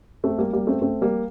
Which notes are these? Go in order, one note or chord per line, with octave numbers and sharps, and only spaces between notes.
A3 C4
G3 A#3
G3 A#3
A3 C4
A3 C4
G3 A#3